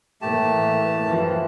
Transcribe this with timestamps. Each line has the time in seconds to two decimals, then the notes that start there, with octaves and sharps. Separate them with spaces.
0.21 A2 E3 A3 A#3 G4 A5
1.06 F#2 E3 F3